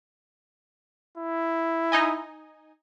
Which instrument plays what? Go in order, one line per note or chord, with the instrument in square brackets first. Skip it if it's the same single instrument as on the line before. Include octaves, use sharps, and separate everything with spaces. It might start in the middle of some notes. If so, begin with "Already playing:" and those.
[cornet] E4
[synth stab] D#4 D#5 G#5